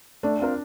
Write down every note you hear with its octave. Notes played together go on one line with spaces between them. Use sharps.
A3 D4
C4 F4 A#4